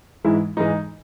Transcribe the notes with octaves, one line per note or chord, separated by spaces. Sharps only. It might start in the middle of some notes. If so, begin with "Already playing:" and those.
G#2 E3 G#3 E4
G#2 E3 G#3 D#4